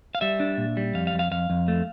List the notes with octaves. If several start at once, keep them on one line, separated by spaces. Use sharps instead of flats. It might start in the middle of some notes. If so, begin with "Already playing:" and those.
F5
G3 E5
D4
A#2
G3
F2 F5
F5
F2
F5
F2 F5
F2
A3